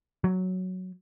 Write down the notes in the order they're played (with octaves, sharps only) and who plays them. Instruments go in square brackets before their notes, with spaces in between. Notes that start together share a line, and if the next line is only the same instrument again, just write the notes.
[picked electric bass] F#3